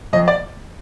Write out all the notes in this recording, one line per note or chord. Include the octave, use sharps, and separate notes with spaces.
F2 D#5
D5